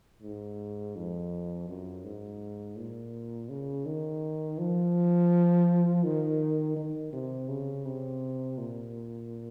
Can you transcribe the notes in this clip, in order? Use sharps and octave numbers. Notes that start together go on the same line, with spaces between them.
G#2
F2
F#2
G#2
A#2
C#3
D#3
F3
D#3
D#3
C3
C#3
C3
A#2